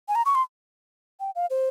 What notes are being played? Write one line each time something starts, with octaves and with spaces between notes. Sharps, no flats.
G#5
A#5
C#6
C6
G5
F5
C5